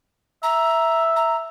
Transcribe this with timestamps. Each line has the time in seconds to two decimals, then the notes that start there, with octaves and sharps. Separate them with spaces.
0.43 E5 A#5
1.16 A#5